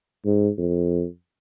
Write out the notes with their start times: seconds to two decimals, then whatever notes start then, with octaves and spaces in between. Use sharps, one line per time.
0.25 G#2
0.58 F2